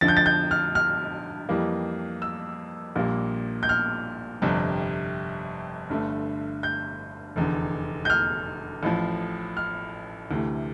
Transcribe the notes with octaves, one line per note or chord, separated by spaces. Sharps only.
F2 D3 F3 A6
G6
A6
G6
F6
F6
F2 E3 G3 A#3
E6
A#1 A#2 G3 A#3
G6
F6
G1 F2 C3 G3
G1 G2 D3 A3
G6
F1 E2 D3
G6
F6
A1 A2 F3
F6
D2 C3 E3 A3